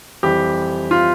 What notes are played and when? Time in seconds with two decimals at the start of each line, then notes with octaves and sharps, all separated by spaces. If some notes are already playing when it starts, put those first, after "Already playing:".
0.23 F2 E3 G3 G4
0.91 F4